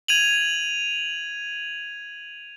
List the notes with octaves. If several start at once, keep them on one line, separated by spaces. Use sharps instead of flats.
G#6 D#7 F7 F#7